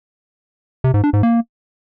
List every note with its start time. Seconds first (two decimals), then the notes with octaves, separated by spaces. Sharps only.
0.84 C3
0.94 G#2
1.04 D4
1.13 G#2
1.23 A#3